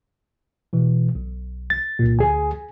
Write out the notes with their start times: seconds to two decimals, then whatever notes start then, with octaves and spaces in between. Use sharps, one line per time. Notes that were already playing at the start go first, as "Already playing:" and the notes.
0.73 B2 E3
1.15 B1
1.70 A6
1.99 C2 A#2
2.19 D2 G#4 G#5